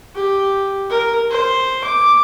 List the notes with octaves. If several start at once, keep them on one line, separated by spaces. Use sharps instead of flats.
G4
A#4
C5
D6